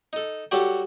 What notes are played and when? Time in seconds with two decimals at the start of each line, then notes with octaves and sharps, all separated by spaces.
0.13 D#4 A4
0.51 F#3 G3 F#4 G4 A4 F#5